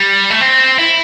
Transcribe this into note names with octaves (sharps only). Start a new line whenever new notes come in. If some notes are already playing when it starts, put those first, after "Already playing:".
Already playing: G3
A3
C4
E4